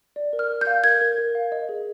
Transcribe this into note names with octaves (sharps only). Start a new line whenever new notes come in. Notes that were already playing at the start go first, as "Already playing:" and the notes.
D5
A#4
F6
A#4
G6
F5
A#4 G#6
A#4
A#4
F5
D#5
G#4